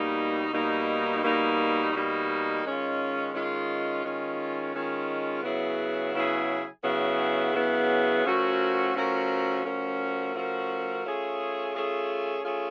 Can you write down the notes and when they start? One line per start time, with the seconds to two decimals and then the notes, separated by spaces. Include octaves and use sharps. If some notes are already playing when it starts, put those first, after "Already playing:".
Already playing: B2 G3 A#3 D#4
0.53 B2 G3 A#3 D#4
1.23 B2 G3 A#3 D#4
1.93 B2 G3 A#3 D#4
2.64 D#3 G#3 C#4 F4
3.34 D#3 G#3 C#4 F4
4.04 D#3 G#3 C#4 F4
4.74 D#3 G#3 C#4 F4
5.43 C#3 F#3 B3 E4 G#4
6.14 C#3 F#3 B3 E4 G#4
6.83 C#3 F#3 B3 E4 G#4
7.53 C#3 F#3 B3 E4 G#4
8.24 F3 A3 C#4 F#4 A#4
8.94 F3 A3 C#4 F#4 A#4
9.64 F3 A3 C#4 F#4 A#4
10.34 F3 A3 C#4 F#4 A#4
11.05 A3 C#4 F4 G#4
11.75 A3 C#4 F4 G#4
12.45 A3 C#4 F4 G#4